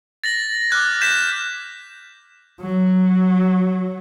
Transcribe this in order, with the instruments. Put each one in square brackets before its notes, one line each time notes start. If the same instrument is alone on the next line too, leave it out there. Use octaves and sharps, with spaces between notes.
[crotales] A6 A#6 F#7
D6 F6 F#6 G#6
G6 G#6 B6 E7
[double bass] F#3